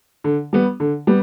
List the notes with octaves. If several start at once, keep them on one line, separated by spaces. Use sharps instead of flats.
D3
G3 B3
D3
G3 B3